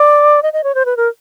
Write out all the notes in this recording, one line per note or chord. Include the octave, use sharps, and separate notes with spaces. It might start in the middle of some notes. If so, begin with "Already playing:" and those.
Already playing: D5
D#5
D#5
C#5
C5
B4
A#4